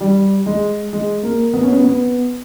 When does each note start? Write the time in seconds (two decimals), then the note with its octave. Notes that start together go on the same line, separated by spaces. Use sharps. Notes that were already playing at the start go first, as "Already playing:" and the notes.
0.01 G3
0.46 G#3
0.93 G#3
1.23 A#3
1.54 B3
1.63 C#4
1.73 B3
1.84 B3